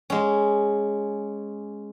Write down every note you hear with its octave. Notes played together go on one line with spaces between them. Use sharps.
G#3 C#4